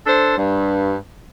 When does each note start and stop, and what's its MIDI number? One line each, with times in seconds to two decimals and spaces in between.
0.06 0.34 62
0.06 0.34 69
0.06 0.34 72
0.37 0.95 43